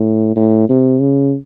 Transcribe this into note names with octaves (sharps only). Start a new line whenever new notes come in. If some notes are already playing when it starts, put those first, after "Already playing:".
Already playing: A2
A2
C3
C#3